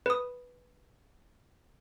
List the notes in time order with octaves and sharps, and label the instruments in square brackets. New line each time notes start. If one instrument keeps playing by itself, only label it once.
[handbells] B4 D#6